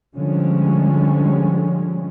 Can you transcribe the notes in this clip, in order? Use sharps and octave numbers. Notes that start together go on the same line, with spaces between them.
D3 F3 G3 G#3 C#4